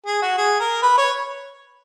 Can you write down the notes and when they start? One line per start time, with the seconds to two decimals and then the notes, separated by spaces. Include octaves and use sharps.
0.06 G#4
0.22 F#4
0.37 G#4
0.60 A#4
0.82 B4
0.97 C#5